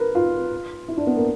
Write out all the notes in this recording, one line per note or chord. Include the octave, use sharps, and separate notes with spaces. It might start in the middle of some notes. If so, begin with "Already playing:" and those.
Already playing: A#4 B4
F4
E4
D4
B3
A#3